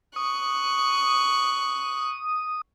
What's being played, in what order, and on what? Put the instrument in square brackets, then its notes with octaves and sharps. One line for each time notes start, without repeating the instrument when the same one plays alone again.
[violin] C#6 F#6 [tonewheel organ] D#6